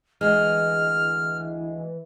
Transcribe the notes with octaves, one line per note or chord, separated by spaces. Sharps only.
D2 E3 G#3 F6